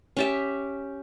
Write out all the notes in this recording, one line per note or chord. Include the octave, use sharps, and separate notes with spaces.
C#4 G4 E5